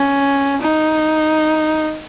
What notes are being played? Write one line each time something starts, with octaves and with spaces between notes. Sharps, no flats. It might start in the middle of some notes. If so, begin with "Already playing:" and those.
Already playing: C#4
D#4